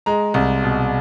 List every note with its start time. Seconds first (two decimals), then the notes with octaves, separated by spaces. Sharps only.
0.06 G#3 A#5
0.34 C2
0.63 B2